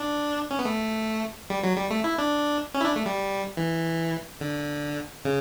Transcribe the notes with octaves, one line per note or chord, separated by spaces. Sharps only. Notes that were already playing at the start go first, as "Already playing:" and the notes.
Already playing: D4
C#4
B3
A3
G3
F#3
G3
A3
E4
D4
C#4
E4
D4
A3
G3
E3
D3
C#3